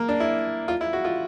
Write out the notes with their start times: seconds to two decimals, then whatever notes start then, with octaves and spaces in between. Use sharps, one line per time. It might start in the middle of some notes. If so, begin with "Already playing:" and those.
Already playing: A#3
0.09 D4
0.20 E4
0.68 F4
0.81 E4
0.93 F#4
1.05 F4